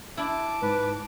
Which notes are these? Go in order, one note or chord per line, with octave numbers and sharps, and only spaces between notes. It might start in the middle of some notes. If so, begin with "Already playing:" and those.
D4 E4 A5 D6
G#2 B4